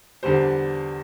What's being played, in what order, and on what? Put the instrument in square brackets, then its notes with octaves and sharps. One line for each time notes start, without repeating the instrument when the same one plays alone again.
[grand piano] E2 D3 G3 C5